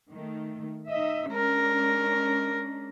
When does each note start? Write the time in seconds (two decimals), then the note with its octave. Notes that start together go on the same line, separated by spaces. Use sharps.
0.11 D#3 A3
0.90 D#4 D#5 E5
1.33 G#3 C#4 D4 A#4